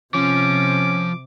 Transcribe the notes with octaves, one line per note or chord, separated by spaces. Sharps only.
C3 F3 C#4 D6